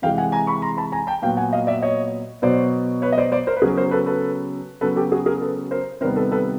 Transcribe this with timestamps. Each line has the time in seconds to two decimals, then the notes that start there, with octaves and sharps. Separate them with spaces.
0.02 C3 E3 G#3 F5 G5
0.18 F#5 G#5
0.32 G#5 A#5
0.47 B5 C#6
0.62 A#5 C6
0.77 A5 B5
0.92 G#5 A#5
1.07 G5 A5
1.22 A#2 F#3 B3 F5 G5
1.37 F#5 G#5
1.53 D#5 F5
1.67 D5 E5
1.82 C#5 D#5
2.42 B2 F#3 B3 C5 D5
3.02 B4 C#5
3.12 D#5
3.18 C5 D5
3.32 C5 D5
3.47 A#4 C5
3.57 B4
3.62 C#3 F#3 B3 G#4 A#4
3.76 A#4 C5
3.91 A4 B4
4.06 A4 B4
4.81 C#3 F#3 B3 A4 B4
4.96 G4 A4
5.11 F#4 G#4
5.26 G#4 A#4
5.42 A4 B4
5.71 A#4 C5
6.01 C3 D#3 G3 B3 A#4 C5
6.16 A4 B4
6.32 A4 B4